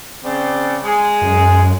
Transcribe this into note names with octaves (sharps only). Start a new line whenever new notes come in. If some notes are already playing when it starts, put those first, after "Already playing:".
C#3 C4 D5
G#3 G#4
F#2